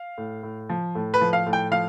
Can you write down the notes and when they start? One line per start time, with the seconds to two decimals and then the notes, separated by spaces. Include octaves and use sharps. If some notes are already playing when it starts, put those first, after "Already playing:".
Already playing: F5
0.18 A2
0.43 A2
0.69 F3
0.95 A2
1.14 B4
1.21 F3
1.33 F5
1.46 A2
1.53 G5
1.71 F3 F5